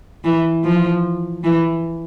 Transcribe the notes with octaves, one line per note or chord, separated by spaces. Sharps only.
E3
F3
E3